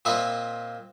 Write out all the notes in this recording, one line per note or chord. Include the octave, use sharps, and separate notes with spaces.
A#2 C4 D#5 E5 B5